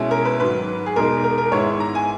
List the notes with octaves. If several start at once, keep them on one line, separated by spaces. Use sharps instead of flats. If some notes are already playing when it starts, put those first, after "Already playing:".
Already playing: B2 G#3 C#4 E4
A#4
B4
G#2 D#3 F#3 B4
G#4
E2 B2 G#3 D#4 A#4
A#4
A#4
G#2 D#3 G#3 B3 E4 C#5
A#5
G#5